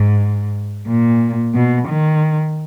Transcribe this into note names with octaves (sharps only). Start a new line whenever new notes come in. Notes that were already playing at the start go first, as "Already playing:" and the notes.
Already playing: G#2
A#2
B2
D#3